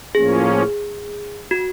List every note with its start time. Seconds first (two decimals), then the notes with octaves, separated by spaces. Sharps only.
0.15 A2 F3 A#3 C#4 G#4
1.51 F#4